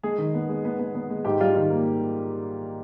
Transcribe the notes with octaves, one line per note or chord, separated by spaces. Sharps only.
G#3 G#4
D#3
B3
G#3
B3
B3
B3
G#3
G#2 G4
G3 F4
D#3 F4
A#3